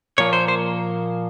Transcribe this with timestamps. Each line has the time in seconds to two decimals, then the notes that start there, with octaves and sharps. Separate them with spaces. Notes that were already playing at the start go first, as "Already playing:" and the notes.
0.18 A#2 F3 A#3 C#5
0.33 C5
0.48 C5